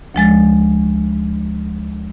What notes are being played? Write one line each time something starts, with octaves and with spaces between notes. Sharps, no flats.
D2 F3 G#3 A6